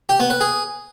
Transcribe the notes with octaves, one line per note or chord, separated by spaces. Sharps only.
G4
B3
B4
G#4